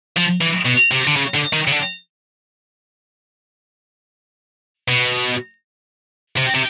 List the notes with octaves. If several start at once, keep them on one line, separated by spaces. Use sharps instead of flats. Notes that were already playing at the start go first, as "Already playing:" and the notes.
F3
E3
B2
C3
D3
C#3
D3
D#3
C#3
D3
B2
C3
C3